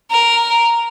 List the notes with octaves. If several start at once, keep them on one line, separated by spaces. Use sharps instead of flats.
A#4